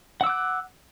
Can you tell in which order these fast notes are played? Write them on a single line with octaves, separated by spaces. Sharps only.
F#5 E6 D6 F#6